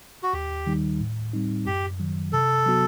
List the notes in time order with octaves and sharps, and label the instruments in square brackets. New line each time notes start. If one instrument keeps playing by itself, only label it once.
[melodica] F#4
[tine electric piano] D#2 [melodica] G4
[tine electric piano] D#3 G3 D#4
A2
G3 C4 D#4
[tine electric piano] F#2 [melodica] G4
[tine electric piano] D#3 F#3
[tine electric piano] C3 [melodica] A4
[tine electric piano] F#3 B3 F#4